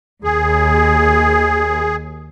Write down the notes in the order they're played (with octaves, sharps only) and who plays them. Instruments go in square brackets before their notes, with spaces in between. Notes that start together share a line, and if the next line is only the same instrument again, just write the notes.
[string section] D#2 [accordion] G#4